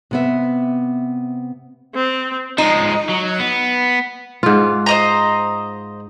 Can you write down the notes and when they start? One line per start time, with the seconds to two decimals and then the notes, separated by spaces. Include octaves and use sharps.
0.11 C3 B3 E5
1.95 C4
2.58 F3 G#3 D#4
3.09 F#3
3.40 B3
4.43 G#2 F4
4.86 C5 D#5 A#5